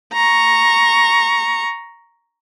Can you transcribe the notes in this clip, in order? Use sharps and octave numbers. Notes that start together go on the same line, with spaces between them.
A#5 C#6